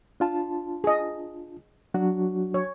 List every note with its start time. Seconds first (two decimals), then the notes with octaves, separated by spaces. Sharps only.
0.20 D4 F4 A5
0.84 G#4 D#5
1.94 F#3 D4 F#4
2.54 C#5